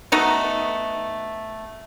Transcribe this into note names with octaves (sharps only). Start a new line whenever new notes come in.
A3 B3 D#4 F#4